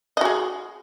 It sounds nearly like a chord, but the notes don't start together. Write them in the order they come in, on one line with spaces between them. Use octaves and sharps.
D#5 F#4 G#4